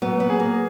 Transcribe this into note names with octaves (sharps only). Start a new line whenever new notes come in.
F#3 B3
B3
G#4
A#3